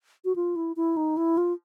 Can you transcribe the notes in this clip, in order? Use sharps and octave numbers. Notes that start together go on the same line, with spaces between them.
F#4
F4
E4
E4
D#4
E4
F4